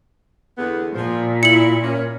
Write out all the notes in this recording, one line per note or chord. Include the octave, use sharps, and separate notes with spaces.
E2 D3 B3
A#2 F3
E4 C#7 F#7
A#3 C#4